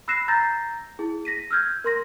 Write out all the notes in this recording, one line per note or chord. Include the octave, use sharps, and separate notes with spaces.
B5 E6 F#6 A#6 C7 E7
A#5 E6 G6 A6 A#6
E4 G#4
A#6 B6 D#7
E6 F6 G6 G#6
A#4 C6 A#6